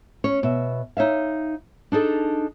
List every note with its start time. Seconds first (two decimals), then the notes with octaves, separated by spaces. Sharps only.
0.24 C#4 C#5
0.43 B2 E5
0.97 D#4 C#5 E5 F5
1.92 D4 D#4 G#4 A4